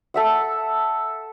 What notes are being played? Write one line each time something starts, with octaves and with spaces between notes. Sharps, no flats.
A4 E5 F#5